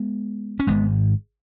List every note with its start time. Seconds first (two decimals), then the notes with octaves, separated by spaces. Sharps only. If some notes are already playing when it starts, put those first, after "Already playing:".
Already playing: G#3 B3
0.60 C#4
0.67 G#1 G#2 G#3 B3